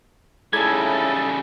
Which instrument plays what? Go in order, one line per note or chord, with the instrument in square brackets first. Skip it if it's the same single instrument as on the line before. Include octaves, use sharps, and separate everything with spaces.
[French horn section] A2 E4 G#4 [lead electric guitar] C#3 G3 [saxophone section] D#4 A4 [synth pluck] G#6